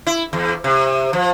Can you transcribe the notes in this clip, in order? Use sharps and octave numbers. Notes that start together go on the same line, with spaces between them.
E4
E2
C3
F3